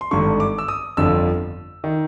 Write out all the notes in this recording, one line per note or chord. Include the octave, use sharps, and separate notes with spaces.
C6
G#1 G2 D3 C#6
D6
E6
D#6
G1 F2 D3 F3 E6
D#3